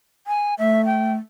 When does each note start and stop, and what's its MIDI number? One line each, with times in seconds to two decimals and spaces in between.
0.27 0.54 80
0.59 1.15 57
0.59 0.85 76
0.85 1.12 79